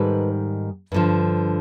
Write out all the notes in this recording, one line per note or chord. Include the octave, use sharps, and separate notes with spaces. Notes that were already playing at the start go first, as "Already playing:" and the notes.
Already playing: G#2 D#3 G3 A4 B4
G2 D3 F3